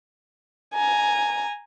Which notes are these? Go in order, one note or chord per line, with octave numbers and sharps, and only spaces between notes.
G#5 A#5